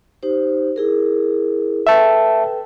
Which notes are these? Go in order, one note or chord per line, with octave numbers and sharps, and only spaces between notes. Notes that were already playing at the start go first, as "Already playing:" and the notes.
D#4 G4 C5
E4 G#4 A#4
A4 B4 E5 G5 A5